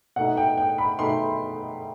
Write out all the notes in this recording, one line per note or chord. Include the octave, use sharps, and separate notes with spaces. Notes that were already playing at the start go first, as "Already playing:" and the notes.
B2 A3 D#4 F#5
G5
G5
B5
B2 A3 D#4 C6